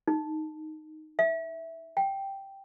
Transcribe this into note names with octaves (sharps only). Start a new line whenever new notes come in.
D#4
E5
G5